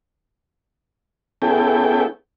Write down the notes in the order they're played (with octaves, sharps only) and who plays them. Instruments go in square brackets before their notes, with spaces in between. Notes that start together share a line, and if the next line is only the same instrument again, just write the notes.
[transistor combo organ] B3 C#4 E4 G#4 A4 G5